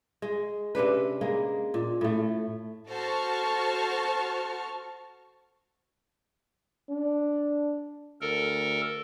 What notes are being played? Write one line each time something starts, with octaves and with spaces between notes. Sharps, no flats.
G#3
C3 C#4 D4 B4
G#3 A#3
A#2
A2 A3
F#4 A4 C5 A5 C#6 F6
D4
D2 A4 A#4